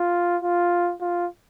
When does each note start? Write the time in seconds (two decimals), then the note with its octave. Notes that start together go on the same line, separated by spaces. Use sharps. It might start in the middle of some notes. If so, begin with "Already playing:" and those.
Already playing: F4
0.42 F4
1.01 F4